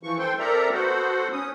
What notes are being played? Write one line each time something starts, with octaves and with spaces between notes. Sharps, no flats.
E3 F3 C#6
A4 C5 G5 C6
C4 A4 A#4 D5 E5 A#5
B3 F#4 A4 C5 F#5
C#4 D#6